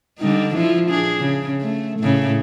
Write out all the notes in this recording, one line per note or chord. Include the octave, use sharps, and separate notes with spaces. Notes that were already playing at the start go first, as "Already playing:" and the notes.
D3 G3 D#4
F3 E4 F4
D4 G#4
C#3
A3
A2 C#3